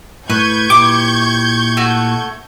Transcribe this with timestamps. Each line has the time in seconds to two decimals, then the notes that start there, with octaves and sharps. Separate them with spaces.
0.30 A2 B4 C#6 G6 G#6
0.70 A#2 E4 G4 D6
1.77 A3 F#4